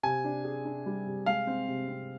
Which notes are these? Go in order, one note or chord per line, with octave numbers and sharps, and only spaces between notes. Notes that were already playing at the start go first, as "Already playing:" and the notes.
C3 G#5
D4
G#4
D4
G3
C3
G#3 F5
C4
C3
C4